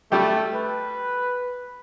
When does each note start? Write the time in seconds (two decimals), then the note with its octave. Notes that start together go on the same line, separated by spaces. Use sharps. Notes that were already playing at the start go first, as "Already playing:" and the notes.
0.12 G3 A3 G4
0.54 B4